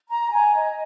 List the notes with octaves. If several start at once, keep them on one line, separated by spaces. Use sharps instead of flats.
A#5
G#5
D#5